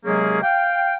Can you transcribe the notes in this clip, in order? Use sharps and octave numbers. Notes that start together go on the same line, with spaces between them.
C3 F#3 G#3 A#3 C#4 G#4
F5 G5